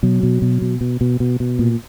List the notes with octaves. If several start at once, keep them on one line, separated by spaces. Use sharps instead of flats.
B2 F#3
B2
B2
B2
B2
B2
B2
B2
A#2